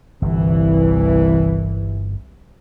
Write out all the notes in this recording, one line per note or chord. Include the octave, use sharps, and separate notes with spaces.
G1 C2 E3